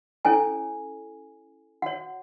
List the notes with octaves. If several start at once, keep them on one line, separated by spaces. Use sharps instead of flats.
C#4 E4 A4 C#5 G#5
F#4 C#5 F#5